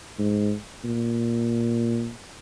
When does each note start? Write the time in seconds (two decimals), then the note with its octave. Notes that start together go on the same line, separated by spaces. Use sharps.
0.19 G#2
0.85 A#2